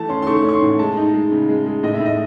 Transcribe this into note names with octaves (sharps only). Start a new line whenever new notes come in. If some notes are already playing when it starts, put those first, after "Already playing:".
Already playing: E3 A3 A5
C#4 C6
C6
A3 C#6
C#4 C#6
C6
A2
G#3 A5
D#4
G#3
C#3
G#3
G#3
A2 D#5
E5
A2
D#5